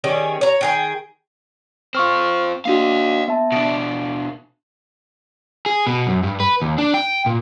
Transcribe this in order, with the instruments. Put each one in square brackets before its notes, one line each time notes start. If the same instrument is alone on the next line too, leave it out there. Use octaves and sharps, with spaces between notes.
[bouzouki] D#3 G3 C#4 G#4
C#5 A#5
D#3 G#4 G5
[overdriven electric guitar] C4 F4 [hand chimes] C#6 F6
[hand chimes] A#3 D4 F#4 [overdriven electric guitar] D#5 F5
[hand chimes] B3 E5 A5
[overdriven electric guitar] B2 D4 [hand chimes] D7
[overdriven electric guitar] G#4
B2
F#2
G2
B4
D#2
D4
G5
A#2